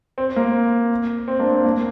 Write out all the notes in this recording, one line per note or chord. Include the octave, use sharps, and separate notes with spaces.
C4
A#3
C4
A#3 D4
C4
A#3